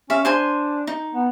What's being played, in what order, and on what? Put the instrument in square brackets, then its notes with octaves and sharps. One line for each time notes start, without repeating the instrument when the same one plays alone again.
[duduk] C#4 [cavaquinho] E5 F5 C#6
[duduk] D4 [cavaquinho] C5 G#5 C6
[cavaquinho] D#4
[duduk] B3